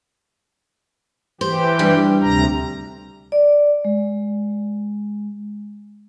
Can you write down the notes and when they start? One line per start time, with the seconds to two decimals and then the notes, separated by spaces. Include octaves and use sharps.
1.41 E3 G4 C5
1.79 G2 G3
2.21 D2 C3 A#5
3.32 D5
3.85 G#3